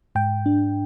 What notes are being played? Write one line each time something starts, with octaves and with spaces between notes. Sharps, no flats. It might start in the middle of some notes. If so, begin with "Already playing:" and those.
G#2 G5
D4